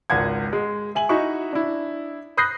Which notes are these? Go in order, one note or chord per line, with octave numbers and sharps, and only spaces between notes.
G#1 C#2 F#5 G#6
G#3
E5 G#5 F#7
D#4 E4 F#4 E5 C#6
D4 E4
B5 D#6 F#6 G6 A#6 C7